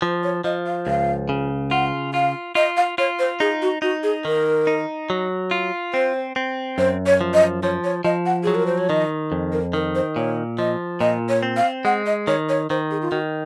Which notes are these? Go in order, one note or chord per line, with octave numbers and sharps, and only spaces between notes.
F3 C5
C#5
F3 D#5
F5
C#2 F5
C#3
F4 F#5
F4 F5
F4 D#5
F5
F4 C#5
C5
D#4 G#4
F#4
D#4 F#4
G#4
D#3 A#4
D#4
F#3
F4
C4 C5
C4
F#2 C5
C#5
F3
D#5
F3 C#5
C#5
F3 D#5
F#5
F#3 G#4
A#4
C5
C#5
D#3 D#5
F2
A#4
D#3 A#4
C5
A#2 C#5
F3 D#5
A#2 D#5
C#5
C4
F5
G#3 F#5
D#5
D#3 C#5
C#5
D#3 C5
G#4
F4
D#3 F#4